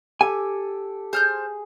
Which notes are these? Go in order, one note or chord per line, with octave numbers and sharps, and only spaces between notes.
G4 A4 G#5
G#4 C5 F6 G6